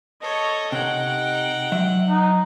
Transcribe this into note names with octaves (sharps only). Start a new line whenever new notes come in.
A4 C#5 D#5
C3 D#4 F#5 G5
F#3 E5
D#4